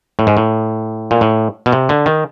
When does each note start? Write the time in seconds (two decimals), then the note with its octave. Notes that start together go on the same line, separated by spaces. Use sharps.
0.19 A2
0.27 G#2
0.37 A2
1.11 A#2
1.21 A2
1.66 B2
1.73 C3
1.89 D3
2.06 D#3